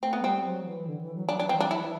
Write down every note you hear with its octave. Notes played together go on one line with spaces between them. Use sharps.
A3 C4
B3
G3 C4
F#3
E3
D3
E3
F#3
F#3 D4
D4
E3
C4
G3 D4
F#3 E4
E3